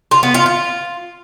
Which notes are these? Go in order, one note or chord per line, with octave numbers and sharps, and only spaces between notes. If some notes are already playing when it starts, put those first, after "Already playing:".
F4
B3
F4
F4